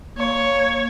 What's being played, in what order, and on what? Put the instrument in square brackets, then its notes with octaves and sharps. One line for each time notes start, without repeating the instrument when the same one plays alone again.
[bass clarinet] A#3 [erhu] C#5